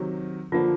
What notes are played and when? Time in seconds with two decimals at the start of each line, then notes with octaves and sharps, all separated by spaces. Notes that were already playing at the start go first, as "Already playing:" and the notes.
Already playing: C3 D#3 F#3
0.52 D3 F3 A#3 F4